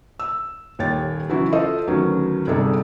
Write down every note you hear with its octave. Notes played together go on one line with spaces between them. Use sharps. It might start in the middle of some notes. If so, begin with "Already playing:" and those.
E6
D#1 D#2 C#5 G5 A6
C#3 E3 F#3 B3 E4 F#4
F4 A4 C5 D#5 E5
D2 D#3 F#3 B3 C#4
G1 C3 G3 D#4 G#4 A4